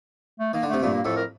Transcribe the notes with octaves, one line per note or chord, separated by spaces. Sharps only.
A3
D#3 A#3
D3
C3 A3
G2 A#2 A3
A#3
F2 A2 A4
A#4